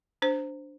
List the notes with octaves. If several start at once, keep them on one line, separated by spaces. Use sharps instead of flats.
D4 C5